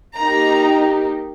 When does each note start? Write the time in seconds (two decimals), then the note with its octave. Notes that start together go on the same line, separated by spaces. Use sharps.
0.17 A#3 D#4 G4 A#5